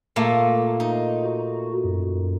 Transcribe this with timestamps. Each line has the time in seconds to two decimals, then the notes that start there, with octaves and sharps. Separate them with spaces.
0.16 A#2 A3 A#3
0.80 D#4
1.24 F#4
1.84 F#2